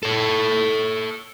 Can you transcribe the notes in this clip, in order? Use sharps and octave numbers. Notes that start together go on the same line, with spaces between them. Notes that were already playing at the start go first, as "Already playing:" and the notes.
A4 C#5